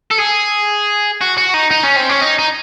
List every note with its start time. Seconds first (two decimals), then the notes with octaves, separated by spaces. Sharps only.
0.11 A4
0.19 G#4
1.21 F#4
1.38 F#4
1.54 D#4
1.71 D#4
1.83 C#4
1.96 C4
2.09 C#4
2.21 D#4
2.39 D#4